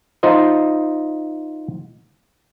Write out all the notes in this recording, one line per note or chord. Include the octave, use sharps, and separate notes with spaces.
D#4 F4 C5 D#5